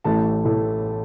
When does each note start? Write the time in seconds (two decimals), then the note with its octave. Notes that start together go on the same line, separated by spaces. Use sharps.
0.04 A1 A2 E3 A3 A5
0.45 A2 E3 A3